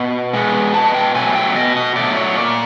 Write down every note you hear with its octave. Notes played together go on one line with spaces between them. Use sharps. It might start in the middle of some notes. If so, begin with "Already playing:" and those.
Already playing: B2 A5
G#3 B3
B2 A5
G5
F#3 A3 G#5
G5
B2 D#5
D#5
F#3 A3 D5
C#5
A#2 D5